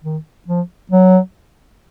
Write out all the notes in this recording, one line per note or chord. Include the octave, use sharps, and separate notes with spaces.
D#3
F3
F#3